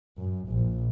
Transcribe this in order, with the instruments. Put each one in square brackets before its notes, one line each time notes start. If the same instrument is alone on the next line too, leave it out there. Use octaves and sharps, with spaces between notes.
[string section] F#2
A#1